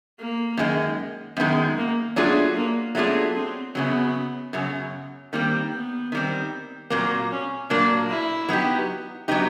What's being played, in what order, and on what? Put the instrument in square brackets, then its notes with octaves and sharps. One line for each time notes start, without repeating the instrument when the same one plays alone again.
[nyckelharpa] A#3
[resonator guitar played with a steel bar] F#2 D#3 G#3
[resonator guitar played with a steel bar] F#2 D#3 G#3 [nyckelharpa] B3
[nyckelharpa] A#3
[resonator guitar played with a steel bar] F#3 A3 D4 F4 G#4 [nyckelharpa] B3
[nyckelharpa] A#3
[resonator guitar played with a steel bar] F#3 A3 D4 F4 G#4 [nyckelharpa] B3
[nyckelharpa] C4
[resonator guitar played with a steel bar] F#2 C#3 F#3 [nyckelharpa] B3
[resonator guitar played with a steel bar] F#2 C#3 F#3
[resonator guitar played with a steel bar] D#3 G3 C4 [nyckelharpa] A#3
[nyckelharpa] B3
[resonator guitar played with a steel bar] D#3 G3 C4
[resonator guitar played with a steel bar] A#2 F#3 A#3 [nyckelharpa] C4
[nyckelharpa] C#4
[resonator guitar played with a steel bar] A#2 F#3 A#3 [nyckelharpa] D4
[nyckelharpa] E4
[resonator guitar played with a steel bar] F#3 B3 D#4 G4
F#3 B3 D#4 G4